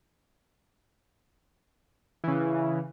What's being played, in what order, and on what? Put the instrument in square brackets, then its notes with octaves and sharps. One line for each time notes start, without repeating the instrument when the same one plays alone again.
[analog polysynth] C#3 E3